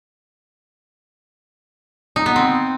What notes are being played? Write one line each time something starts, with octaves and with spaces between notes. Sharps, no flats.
D#4
B3
C4